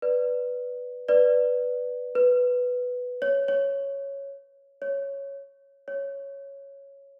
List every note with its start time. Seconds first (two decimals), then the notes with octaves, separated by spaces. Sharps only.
0.02 B4 D5
1.08 B4 D5
2.15 B4
3.22 C#5
3.48 C#5
4.82 C#5
5.88 C#5